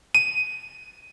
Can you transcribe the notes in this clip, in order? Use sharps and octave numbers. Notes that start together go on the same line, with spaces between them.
D#7